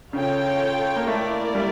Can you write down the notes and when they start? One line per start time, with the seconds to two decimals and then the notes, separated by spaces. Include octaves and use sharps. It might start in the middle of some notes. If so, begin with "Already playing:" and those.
0.13 C#3 F4 A4 C#5 G5
0.96 A#3
1.07 A3 A#3 E4 A#4 D5
1.55 G3